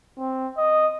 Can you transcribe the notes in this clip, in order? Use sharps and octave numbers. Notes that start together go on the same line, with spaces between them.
C4
D#5